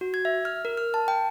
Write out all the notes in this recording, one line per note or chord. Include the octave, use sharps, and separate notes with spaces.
F#4
G#6
E5
F6
A#4
F6
A5
G5